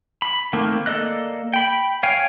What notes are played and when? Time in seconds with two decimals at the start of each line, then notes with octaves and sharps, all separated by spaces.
0.22 B5
0.53 D#3 A3 A#3 C4
0.86 A#3 A4 D5 D#5 F#6
1.53 G5 B5
2.03 C#5 F5 G5 G#5